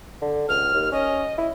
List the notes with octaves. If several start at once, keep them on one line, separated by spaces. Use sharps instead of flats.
D3
C#2 F6
D#2
C#4 D#5
E4